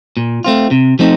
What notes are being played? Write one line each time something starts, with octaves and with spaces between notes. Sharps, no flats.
A#2
A3 C4 F4
C3
F3 A3 C4 D#4